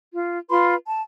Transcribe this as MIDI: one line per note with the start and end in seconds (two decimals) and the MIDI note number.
0.16 0.38 65
0.50 0.75 65
0.50 0.75 71
0.50 0.75 83
0.50 0.75 84
0.86 1.02 81